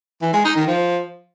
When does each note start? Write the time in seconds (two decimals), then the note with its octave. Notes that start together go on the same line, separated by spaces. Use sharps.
0.22 E3
0.33 G#3
0.45 D#4
0.56 D#3
0.67 F3